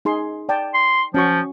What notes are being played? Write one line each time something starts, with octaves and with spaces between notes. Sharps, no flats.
D#4 G#4 C6
D5 G5 A5
C6
F3 C#4 F#4 C#6